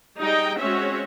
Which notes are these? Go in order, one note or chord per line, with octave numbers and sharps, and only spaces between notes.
G3 D#4 G#4 D#5 G5
G#3 C4 C#4 F#4 C#5 E5